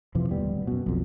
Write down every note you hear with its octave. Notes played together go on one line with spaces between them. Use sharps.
F2 C3 E3 F3
D1 D#2 G3 B3
F#2 B2
B1 F2